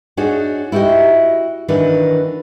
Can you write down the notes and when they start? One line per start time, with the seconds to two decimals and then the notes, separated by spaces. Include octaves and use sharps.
0.17 D4 D#4 F#4 G#4 C#5
0.72 E4 F#4 G4 C#5 D#5
1.68 D#3 E3 D4 F#4 A#4 B4